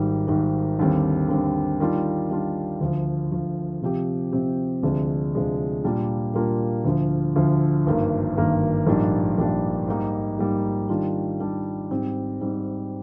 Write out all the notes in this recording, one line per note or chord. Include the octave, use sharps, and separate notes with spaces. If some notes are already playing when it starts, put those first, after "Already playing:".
Already playing: G#1 G#2 D#3 G3
G#1 G#2 D#3 G3
D#2 D3 G3 C4
D#2 D3 G3 C4
D#3 G3 D4 F4
D#3 G3 D4 F4
D2 D3 F3
D2 D3 F3
C3 F3 C4 G4
C3 F3 C4 G4
D2 C3 F3 G#3 D4
D2 C3 F3 G#3 D4
A#2 G3 A#3 D4 F4
A#2 G3 A#3 D4 F4
D2 D3 F3
D2 D3 F3
G#1 G2 D#3 A#3
G#1 G2 D#3 A#3
A#1 G#2 G3 A#3 D4
A#1 G#2 G3 A#3 D4
G#2 G3 A#3 D#4
G#2 G3 A#3 D#4
D#3 G3 D4 F4
D#3 G3 D4 F4
G#2 G3 C4
G#2 G3 C4